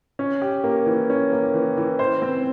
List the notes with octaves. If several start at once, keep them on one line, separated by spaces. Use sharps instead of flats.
C#4
G4
A#3
E3
C#4
A#3
E3
E3
C5
C4